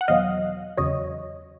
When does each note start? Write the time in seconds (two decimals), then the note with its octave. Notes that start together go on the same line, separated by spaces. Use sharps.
0.01 F#5
0.08 E2 B2 F#3 D#5 F5
0.77 E2 C#3 F#3 C#5 D#5